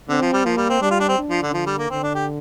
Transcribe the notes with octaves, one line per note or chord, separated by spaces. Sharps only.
D3 C4
F3
G3
F3 A#3
G3
C4
G3 D4
F4
D4
C4
D4
F3
D3
D3 F3
G3
A#3
D3 C4
D4
G4